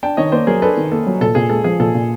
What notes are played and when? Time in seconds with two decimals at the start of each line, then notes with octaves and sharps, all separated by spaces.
0.03 D4 G5 A5
0.17 D#3 C#5 D#5
0.32 A#3 C5 D5
0.47 F#3 G#4 A#4
0.62 D4 A4 B4
0.77 D#3
0.92 A#3 A4
1.07 F#3
1.21 A#2 A4
1.35 A#2 G#4
1.50 G#3 A4
1.64 F3 G#4
1.79 A#2 A4
1.95 A#2